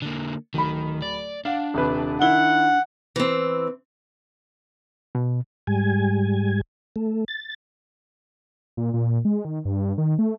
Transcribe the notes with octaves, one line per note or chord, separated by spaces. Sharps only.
D3 A#3
D1 D#3 B5
D5
D4 F5 F#5
D#1 C3 B4
D#3 E4 F#5 G7
E3 C4
B2
G#2 G3 G#5
A3
A6
A#2
A#2
G#3
D#3
G2
D#3
A3